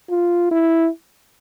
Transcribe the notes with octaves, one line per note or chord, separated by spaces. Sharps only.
F4
E4